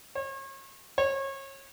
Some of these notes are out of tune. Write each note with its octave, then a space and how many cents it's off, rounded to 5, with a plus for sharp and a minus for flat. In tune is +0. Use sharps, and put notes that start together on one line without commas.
C#5 -40
C#5 -30